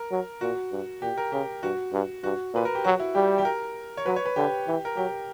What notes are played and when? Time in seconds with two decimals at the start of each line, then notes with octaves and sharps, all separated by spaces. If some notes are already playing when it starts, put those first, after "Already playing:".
Already playing: A#4
0.11 F#3
0.41 A#2 F#4
0.72 G2
1.02 A#2 G4
1.18 A#4
1.32 C#3 G4
1.63 G2 F#4
1.93 G2
2.24 G2 F#4
2.54 A#2 B4
2.65 A#4
2.75 G4
2.84 F#3 F#4
3.00 E4
3.15 G3 G4
3.38 G4
3.45 A#4
3.97 C#5
4.06 F#3 B4
4.16 C#5
4.26 B4
4.36 D3 G4
4.67 E3
4.85 A#4
4.96 F#3 G4